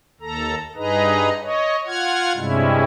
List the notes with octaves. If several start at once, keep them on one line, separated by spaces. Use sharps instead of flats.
D#2 A4 A#5
G2 D#4 G#4 B4 D#5 A#5
C#5 D#5
F4 F#5 F6 G#6
G2 C3 G3 G#3 C#4 E4